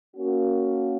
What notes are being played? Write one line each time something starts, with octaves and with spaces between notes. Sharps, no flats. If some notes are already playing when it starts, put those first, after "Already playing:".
A#3 C#4 F#4